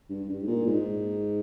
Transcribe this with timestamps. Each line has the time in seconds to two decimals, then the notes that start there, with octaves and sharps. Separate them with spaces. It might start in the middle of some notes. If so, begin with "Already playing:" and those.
0.10 G2
0.29 G2
0.42 G#2
0.47 A#2
0.66 G#2